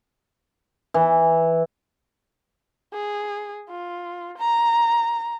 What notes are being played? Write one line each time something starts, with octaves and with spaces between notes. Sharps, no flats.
E3
G#4
F4
A#5